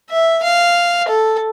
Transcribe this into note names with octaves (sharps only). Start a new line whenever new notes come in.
E5
F5
A4